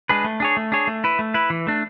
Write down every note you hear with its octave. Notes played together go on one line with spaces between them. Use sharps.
G#3 D4 G#4 B4
A3
D4 G#4 C#5
A3
D4 G#4 C#5
A3
E4 B4
A3
E4 B4
E3
A3 D4